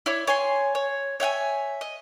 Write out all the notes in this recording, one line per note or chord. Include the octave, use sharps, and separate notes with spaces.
E4 C#5 D5
C#5 G#5 C6
C#5
C#5 E5 F#5 G#5
D#5